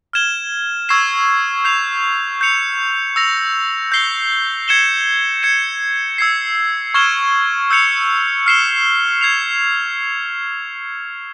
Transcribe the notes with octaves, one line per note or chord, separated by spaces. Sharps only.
F6 G#6 E7 G7
C#6 E6 G#6 C7 E7
G6 C7 F7
G6 C#7 F7
E6 A#6 F7
G6 C7 G7
G#6 C#7 E7 G7
G#6 C#7 E7
E6 G#6 C7
C#6 F6 G#6 E7 G7
E6 G6 C#7 F7
F6 C7 E7 G7
G#6 C7 F7